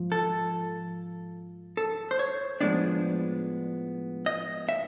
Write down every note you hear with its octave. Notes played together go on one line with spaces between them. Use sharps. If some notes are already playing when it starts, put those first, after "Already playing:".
Already playing: G#2 F3
A4
A4
C5
C#5
A2 F3 G#3 B3 D4 D5
D#5
E5